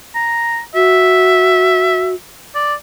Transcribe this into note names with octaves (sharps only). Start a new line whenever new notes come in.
A#5
F#4 E5
D5